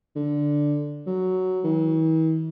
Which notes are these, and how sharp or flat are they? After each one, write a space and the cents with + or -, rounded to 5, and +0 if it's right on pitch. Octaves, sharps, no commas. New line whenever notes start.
D3 +0
F#3 +5
E3 -45